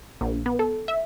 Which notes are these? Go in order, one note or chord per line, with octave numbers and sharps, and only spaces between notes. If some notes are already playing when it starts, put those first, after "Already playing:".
A#1
B3
A4
E5